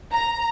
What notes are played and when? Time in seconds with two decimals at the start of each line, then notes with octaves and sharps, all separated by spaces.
0.12 A#5